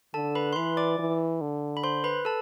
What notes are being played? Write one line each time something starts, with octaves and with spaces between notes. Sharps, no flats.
D3 A4 A5
B4 B5
C6
E3 B4 B5
D5 D6
E3
D3
B5
C5 C6
B4 B5
A4 A5